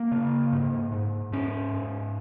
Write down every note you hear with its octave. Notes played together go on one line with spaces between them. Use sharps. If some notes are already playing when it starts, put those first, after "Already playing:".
Already playing: A#3
C#3
G#2
G#2
G#2 C#4
G#2